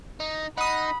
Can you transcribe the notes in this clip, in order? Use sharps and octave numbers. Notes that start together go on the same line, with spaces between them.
D#4
D#4 F#5 B5 D#6